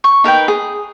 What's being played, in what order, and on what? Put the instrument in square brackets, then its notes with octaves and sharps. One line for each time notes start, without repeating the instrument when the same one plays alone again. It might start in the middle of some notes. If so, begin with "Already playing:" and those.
[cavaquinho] C#6
D#4 A#4 B4 G5
G#4